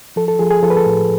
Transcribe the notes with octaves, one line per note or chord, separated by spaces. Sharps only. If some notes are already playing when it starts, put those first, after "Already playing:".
F3 A4
A4
F3 G#4
G#4
F3 A4
B4
A4
A2